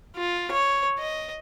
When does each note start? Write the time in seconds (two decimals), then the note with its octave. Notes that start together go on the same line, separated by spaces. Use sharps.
0.16 F4
0.51 C#5
0.99 D#5